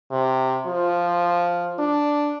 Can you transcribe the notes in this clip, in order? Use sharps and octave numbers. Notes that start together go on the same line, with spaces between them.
C3
F3
D4